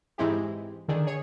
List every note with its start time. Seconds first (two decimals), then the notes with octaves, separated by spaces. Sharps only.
0.18 G#2 E3 G#3 C4 E4 G4
0.88 D3 D#3 D4 G#4
1.06 G#4 C#5